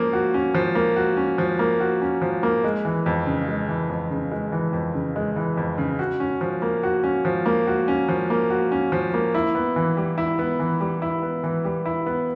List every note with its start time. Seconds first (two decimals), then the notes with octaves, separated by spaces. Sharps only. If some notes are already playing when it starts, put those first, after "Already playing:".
Already playing: F3 A#3 C#4
0.13 F#4
0.34 C#4
0.55 F3
0.75 A#3
0.96 F#4
1.17 C#4
1.38 F3
1.59 A#3
1.80 F#4
2.01 C#4
2.22 F3
2.43 A#3
2.64 G#3
2.85 E3
3.06 F2
3.26 C#3
3.48 G#3
3.69 E3
3.90 F2
4.10 C#3
4.31 G#3
4.52 E3
4.73 F2
4.94 C#3
5.16 G#3
5.36 E3
5.57 F2
5.78 C#3
5.99 F#4
6.20 C#4
6.41 F3
6.62 A#3
6.83 F#4
7.04 C#4
7.25 F3
7.46 A#3
7.67 F#4
7.88 C#4
8.09 F3
8.30 A#3
8.50 F#4
8.72 C#4
8.92 F3
9.14 A#3
9.34 E4
9.55 B3
9.76 E3
9.97 G3
10.18 E4
10.39 B3
10.60 E3
10.80 G3
11.02 E4
11.23 B3
11.44 E3
11.64 G3
11.86 E4
12.06 B3